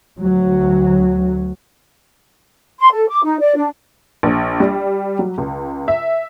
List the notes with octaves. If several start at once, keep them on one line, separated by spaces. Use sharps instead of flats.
D2 F#3
C6
A4
D6
D#4
D5
D4
A#1
G3
F#3
C#2
E5